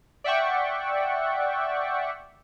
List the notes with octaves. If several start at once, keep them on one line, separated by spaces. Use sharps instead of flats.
D5 E5 F#5 G5 C#6